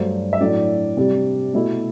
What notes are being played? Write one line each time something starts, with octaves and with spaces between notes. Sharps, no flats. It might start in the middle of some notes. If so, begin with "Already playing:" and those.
Already playing: G2 F#3 A3 D4 C5
E5
A2 F#3 A3 D4 D5
C3 G3 D4
B2 A3 E4